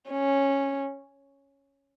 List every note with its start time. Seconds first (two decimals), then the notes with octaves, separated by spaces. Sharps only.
0.10 C#4